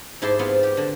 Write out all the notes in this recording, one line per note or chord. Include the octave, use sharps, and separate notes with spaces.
G#2 E4 G4 A5 C6
B3 C4 F4
G4
D3